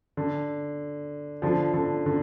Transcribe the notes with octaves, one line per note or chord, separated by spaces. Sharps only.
D3
D3 F3
D3
D3